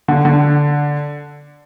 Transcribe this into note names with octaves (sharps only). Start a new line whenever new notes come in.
D3
D3